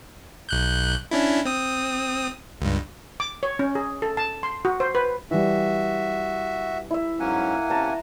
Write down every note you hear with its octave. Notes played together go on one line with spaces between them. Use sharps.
B1 F#6 G6
C#4 D4 E4
C4 D#6
C#2 G2
D6
C#5
C#4
G#4
A4
A5
C6
F#4
C5
B4
E3 G3 F#4 E5
E4 E5
G#2 F#3 A#3 C#4 F#5 G#5
C3 C#4 A5 A#5